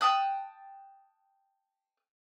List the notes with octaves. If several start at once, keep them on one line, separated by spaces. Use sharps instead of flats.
G5 A5 D#6 F#6